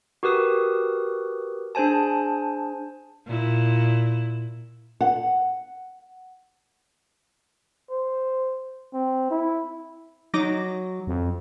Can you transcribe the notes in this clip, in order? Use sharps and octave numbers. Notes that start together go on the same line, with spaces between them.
F#4 G4 A#4 B4 D#6
D4 G#4 C5 G#5 A5
A#2 E4
F#5
C5
C4
E4
F#3 D#4 D6 A#6
F2